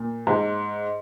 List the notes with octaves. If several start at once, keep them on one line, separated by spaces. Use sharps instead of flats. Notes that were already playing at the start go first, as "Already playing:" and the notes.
Already playing: A#2
G#2